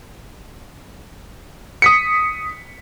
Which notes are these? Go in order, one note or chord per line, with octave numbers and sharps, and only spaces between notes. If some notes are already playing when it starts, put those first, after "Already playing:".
D#6 B6 C#7